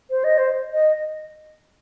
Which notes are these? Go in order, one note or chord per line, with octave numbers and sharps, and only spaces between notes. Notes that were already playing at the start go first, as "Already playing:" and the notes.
C5
D#5
C5
D#5